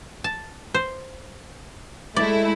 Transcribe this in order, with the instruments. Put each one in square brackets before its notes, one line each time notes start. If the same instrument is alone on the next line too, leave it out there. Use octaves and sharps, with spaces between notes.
[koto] A5
C5
[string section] G#3 A3 E4 [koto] D5